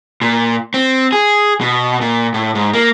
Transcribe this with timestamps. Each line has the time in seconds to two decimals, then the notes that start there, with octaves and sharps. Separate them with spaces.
0.22 A#2
0.74 C4
1.13 G#4
1.61 B2
2.01 A#2
2.34 A2
2.55 G#2
2.73 A#3